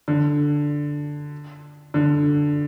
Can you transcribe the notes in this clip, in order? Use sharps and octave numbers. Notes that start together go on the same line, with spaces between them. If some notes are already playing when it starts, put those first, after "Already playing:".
D3
D3